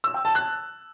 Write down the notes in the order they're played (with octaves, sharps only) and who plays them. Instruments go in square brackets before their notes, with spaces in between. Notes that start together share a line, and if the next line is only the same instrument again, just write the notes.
[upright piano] E6
G5
A5
F#6